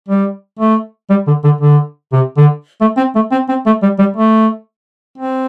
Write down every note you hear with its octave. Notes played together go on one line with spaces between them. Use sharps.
G3
A3
G3
D3
D3
D3
C3
D3
A3
C4
A3
C4
C4
A3
G3
G3
A3
C4